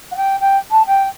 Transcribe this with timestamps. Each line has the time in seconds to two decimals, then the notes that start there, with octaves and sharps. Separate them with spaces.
0.11 F#5
0.16 G5
0.40 G5
0.71 A5
0.86 G5